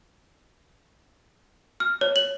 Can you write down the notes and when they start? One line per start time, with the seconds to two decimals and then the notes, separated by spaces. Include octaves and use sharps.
1.80 F6
2.01 C#5
2.16 F#7